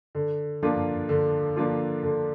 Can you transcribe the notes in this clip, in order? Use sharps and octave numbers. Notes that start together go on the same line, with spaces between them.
D3
F3 A#3 D4 F4
D3
F3 A#3 D4 F4
D3